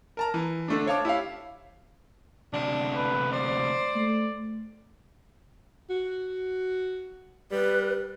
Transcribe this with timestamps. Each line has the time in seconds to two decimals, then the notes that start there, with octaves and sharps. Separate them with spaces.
0.17 A#4 A5 A#5
0.34 E3
0.68 D3 A3 D4
0.87 C5 C#5 F5 A5 D6
1.05 E4 G4 C#5 F5
2.53 D2 C3 D4
2.96 B4
3.32 C5 D5
3.96 A3
5.90 F#4
7.52 G3 B4